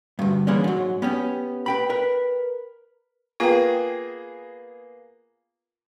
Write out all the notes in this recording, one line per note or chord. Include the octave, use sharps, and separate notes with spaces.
D2 G2
E3 G3 G#3 A#3 C#4 D4
G#2 F#3
B3 C#4 G4
B4 G5 B5
A#4 B4
A#3 B3 F4 G#4 G5